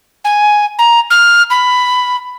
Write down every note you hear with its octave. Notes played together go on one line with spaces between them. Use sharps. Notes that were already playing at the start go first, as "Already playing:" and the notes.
G#5
A#5
F6
B5